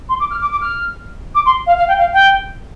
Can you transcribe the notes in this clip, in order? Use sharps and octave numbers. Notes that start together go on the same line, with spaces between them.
C6
D6
F6
D6
D6
F6
D6
C6
F5
F5
G5
F5
G5